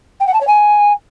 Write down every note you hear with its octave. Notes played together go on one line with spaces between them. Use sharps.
G5
F#5
A5
C#5
G#5